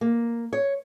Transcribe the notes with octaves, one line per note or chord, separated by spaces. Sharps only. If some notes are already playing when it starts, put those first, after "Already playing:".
A#3
C#5